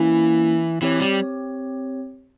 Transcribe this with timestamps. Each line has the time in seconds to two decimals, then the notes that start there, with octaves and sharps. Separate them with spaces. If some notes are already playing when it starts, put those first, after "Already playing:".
Already playing: E3 A#3 C#4 E4
0.82 E3 C4 G4 C#5
1.00 G3